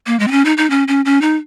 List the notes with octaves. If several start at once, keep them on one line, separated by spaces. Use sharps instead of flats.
A#3
G#3
C4
C#4
D#4
D#4
C#4
C#4
C#4
D#4